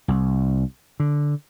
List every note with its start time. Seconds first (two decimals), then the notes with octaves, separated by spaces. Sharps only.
0.08 C2
1.00 D3